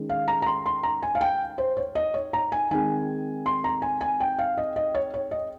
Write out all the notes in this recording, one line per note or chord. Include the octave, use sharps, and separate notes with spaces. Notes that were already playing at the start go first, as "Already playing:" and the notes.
Already playing: D#3 G#3 C#4
F5
A#5
A#5
C6
C6
A#5
G#5
F5
G5
C5
C#5
D#5
C#5
A#5
G#5
D#3 G#3 C4 G#5
C6
A#5
G#5
G#5
G5
F5
D#5
D#5
C#5
C#5
D#5